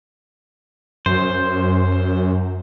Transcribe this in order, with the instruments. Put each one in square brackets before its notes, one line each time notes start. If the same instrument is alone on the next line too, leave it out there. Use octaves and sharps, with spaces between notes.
[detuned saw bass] F#2 [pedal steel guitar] C5